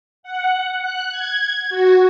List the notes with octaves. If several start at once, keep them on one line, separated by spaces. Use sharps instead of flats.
F#5
F#6
G#6
F#4